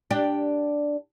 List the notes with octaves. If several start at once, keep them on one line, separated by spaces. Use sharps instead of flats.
D4 G4